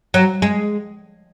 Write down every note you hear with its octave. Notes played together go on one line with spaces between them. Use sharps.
F#3
G#3